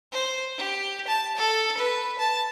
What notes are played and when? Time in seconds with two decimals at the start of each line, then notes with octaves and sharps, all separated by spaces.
0.12 C5
0.58 G4
1.07 A5
1.37 A4
1.78 B4
2.19 A5